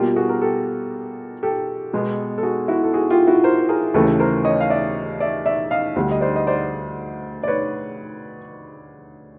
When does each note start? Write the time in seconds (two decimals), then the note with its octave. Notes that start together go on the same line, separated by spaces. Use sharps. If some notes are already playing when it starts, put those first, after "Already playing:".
Already playing: B2 G3 A#3 F4 G4
0.16 F#4 G#4
0.29 A#4
0.42 G4 A4
1.43 G4 A4
1.93 B2 G#3 B3
2.38 A4
2.43 F#4 G#4
2.68 E4 F#4
2.84 A4
2.94 F#4 G#4
3.10 F4 G4
3.27 E4 F#4
3.44 A#4 C5
3.69 G#4 A#4
3.94 D#2 C#3 E3 A3 A4 B4
4.20 A#4 C5
4.45 C#5 D#5
4.60 F5
4.70 D5 E5
5.20 D5 E5
5.46 D5 E5
5.71 D#5 F5
5.96 D2 D3 G3
6.11 D#5
6.21 C5 D5
6.36 D#5
6.47 C5 D5
7.43 D5
7.48 B4 C#5